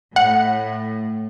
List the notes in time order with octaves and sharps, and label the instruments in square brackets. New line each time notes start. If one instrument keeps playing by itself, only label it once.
[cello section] A2 [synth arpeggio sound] F#5